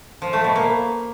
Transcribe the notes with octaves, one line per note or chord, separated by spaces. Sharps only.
F3
A3
B2
A#3